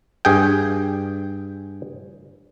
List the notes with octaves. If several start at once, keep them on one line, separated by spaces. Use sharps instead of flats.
G2 G#4 G5